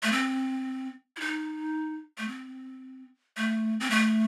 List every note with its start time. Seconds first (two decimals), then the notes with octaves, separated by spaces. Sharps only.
0.03 A3
0.12 C4
1.17 E4
1.21 D#4
2.18 A3
2.28 C4
3.37 A3
3.80 C4
3.90 A3